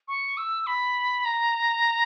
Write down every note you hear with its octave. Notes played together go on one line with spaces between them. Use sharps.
C#6
E6
B5
A#5